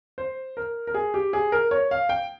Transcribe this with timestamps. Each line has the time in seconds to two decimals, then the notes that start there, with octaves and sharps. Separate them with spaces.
0.18 C5
0.57 A#4
0.87 A#4
0.94 G#4
1.14 G4
1.33 G#4
1.52 A#4
1.71 C#5
1.91 F5
2.09 G5